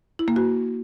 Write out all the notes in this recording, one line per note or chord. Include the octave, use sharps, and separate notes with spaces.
E4
A#3
F#4